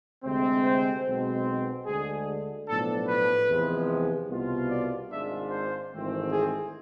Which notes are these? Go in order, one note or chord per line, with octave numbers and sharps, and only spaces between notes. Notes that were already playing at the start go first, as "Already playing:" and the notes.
D2 C3 G#3 C4
C5
B1 B2 G#3 C4
D2 D3 G#3 G#4
B1 A2 F3 B3 D4 A4
B4
E2 C3 F3 G#3
C2 B2 B3 F4
D5
G#1 G#2 G#3 D4 F4 E5
C5
G#1 G#2 E3 A3 C4
G#4